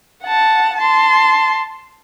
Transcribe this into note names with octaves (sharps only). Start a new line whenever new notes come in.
F#5 A5
A5 C6